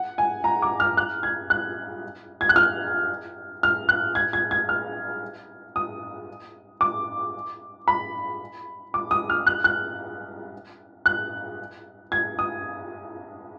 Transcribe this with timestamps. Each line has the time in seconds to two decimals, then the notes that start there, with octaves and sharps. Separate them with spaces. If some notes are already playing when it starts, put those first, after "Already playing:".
Already playing: F#5
0.18 G#5
0.44 A#5
0.62 D6
0.80 F6
0.97 F#6
1.23 G#6
1.50 F#6
2.41 G#6
2.49 F#6
2.56 F6
3.63 F6
3.89 F#6
4.15 G#6
4.33 G#6
4.51 G#6
4.69 F6
5.76 D#6
6.81 D6
7.88 B5
8.94 D6
9.11 D#6
9.30 F6
9.47 F#6
9.64 F#6
11.06 F#6
12.12 G#6
12.39 D#6